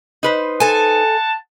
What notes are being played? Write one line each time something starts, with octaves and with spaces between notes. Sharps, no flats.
D#4 B4 C5
A4 F#5 G#5 A5